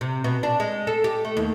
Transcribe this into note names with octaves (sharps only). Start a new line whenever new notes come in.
C3
B2
D4
G#3
A4
G4
A3
D#2